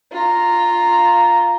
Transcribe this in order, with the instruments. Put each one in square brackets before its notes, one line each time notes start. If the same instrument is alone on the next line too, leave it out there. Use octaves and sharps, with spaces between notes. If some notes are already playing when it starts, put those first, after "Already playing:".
[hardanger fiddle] F4 A#5